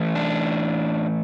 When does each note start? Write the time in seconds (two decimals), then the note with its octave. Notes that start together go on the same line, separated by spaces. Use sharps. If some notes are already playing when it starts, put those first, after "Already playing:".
Already playing: A2 E3 A3
0.15 D4